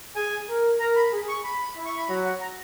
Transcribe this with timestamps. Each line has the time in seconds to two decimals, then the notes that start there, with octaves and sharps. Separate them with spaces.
0.16 G#4 G#5
0.49 A#4
0.80 A#4 A#5
0.96 B5
1.13 G#4
1.28 C#6
1.44 B5
1.76 E4
1.86 C#6
1.97 B5
2.09 F#3 A#5
2.24 F#5
2.41 A#5